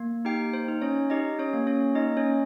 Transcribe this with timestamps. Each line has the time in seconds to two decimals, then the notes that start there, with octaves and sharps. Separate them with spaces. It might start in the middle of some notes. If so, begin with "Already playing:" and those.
Already playing: A#3
0.25 D#4 G4 G5
0.53 C5
0.68 D#4
0.82 C#4 C#5
1.10 D#4 G4 D#5
1.39 C#4 C#5
1.53 A#3
1.67 C#4 C#5
1.95 A#3 D#4 D#5
2.17 C#4 C#5